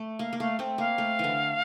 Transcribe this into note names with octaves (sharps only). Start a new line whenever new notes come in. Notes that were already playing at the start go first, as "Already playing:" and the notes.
Already playing: A3
A#3 F5
A#3
A3 F5
A3 C4
A#3 F5
A3
D3 E3